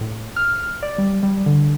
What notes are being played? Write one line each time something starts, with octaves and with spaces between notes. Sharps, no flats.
A2
F6
D5
G3
G3
D3